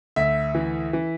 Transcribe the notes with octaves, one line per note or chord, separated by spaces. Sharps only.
D2 E5
E3
E3